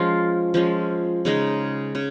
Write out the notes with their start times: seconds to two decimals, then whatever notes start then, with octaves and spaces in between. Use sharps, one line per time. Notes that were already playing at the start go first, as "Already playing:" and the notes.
Already playing: F3 G#3 C#4 F4
0.54 F3 G#3 C#4
1.25 C#3 G#3 D#4
1.95 C#3